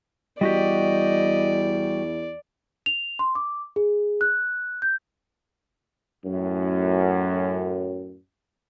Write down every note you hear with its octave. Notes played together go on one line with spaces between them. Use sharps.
E2 G3 F#4 G4 D5 D#5
F7
C6
D6
G#4
F#6
G6
F#2 A2